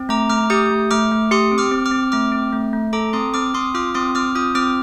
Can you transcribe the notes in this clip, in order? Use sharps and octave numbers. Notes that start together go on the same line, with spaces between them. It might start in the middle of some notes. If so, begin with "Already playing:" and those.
Already playing: C4
A3 A#5 D6
A3 D6 F6
G4 D#6 G6
A3
A3 D6 F6
A3
G4 C6 D#6
C4
D6 F6
C4
D6 F6
C4
A3 D6 F6
C4
A3
A3
A4 A#5 D6
C4 C6 D#6
C4 D6 F6
C4 C6 D#6
F4 D6 F6
C4 C6 D#6
C4 D6 F6
F4 D#6 G6
C4 D6 F6